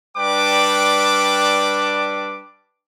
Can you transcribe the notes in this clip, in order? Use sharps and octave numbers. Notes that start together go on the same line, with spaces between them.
G3 D4 B4 G5 D6